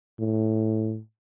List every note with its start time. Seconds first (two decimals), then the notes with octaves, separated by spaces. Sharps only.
0.19 A2